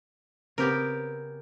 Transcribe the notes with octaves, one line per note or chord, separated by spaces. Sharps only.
C#3 B3 C4 G4 A#4